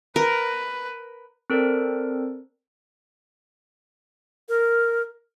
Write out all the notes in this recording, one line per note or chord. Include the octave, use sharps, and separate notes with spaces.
A#4 B4
C4 A4 A#4 C5 D5
A#4